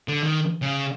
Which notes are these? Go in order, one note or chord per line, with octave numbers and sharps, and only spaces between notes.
D3
D#3
C#3